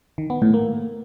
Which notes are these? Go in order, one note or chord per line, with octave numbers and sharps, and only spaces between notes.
D#3
B3
A2
A#3